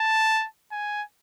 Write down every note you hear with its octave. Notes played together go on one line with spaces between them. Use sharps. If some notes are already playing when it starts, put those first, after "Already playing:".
Already playing: A5
G#5